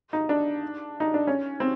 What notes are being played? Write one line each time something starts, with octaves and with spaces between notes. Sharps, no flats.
D#4
D4
D#4
D4
C#4
C4